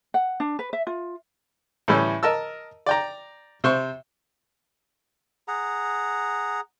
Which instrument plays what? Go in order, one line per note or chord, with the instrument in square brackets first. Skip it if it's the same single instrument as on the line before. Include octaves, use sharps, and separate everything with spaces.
[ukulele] F#5
D4
B4
E5
F4
[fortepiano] A2 E3 G3 C#4 E4
A#4 D#5 A5 E6
D5 G5 A#5
C3 C5 C6 C#6
[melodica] G#4 F#5 A#5